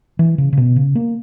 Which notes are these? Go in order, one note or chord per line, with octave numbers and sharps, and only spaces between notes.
E3
C#3
C#3
B2
C#3
A#3